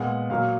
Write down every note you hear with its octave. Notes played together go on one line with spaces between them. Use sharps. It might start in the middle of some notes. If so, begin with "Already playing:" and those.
Already playing: A#2 G#3 B3 F#5
A#2 F#3 A#3 F5